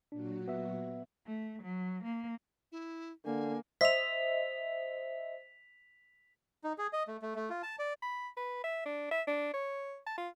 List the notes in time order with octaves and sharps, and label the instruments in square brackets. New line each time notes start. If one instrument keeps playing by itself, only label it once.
[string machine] A#2 F#3 F#4 [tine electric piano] D4
[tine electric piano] B3 E5
[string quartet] A3
F#3
A#3
[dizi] E4
[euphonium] D3 [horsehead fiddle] A#3 [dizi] G#5
[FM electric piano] C5 D#5 E5 [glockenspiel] B6 F7
[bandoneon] D#4
G#4
D#5
A3
A3
A3
F4
A5
D5
[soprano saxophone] B5
B4
E5
D4
E5
D4
C#5
A5
F4